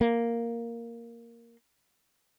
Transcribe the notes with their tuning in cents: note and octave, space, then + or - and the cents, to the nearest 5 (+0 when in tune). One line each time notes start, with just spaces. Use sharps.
A#3 +0